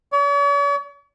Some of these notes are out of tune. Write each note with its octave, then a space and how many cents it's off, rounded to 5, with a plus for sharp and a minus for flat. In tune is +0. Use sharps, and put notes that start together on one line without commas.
C#5 +45